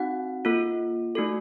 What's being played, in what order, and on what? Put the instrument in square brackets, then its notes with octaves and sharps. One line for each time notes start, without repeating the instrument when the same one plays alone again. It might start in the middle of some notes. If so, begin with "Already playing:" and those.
Already playing: [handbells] C4 D#4 F#4 F#5
A#3 F4 A4
A3 D#4 F#4 A4